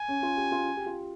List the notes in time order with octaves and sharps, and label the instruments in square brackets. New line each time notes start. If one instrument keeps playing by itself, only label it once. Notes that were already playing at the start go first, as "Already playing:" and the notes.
Already playing: [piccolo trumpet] G#5
[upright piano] C#4
F4
G4
F4
G4
F4